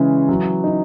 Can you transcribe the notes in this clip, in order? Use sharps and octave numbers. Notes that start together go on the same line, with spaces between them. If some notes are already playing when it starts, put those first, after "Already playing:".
Already playing: C#3 E3 G#3 C#4
F#3
D#4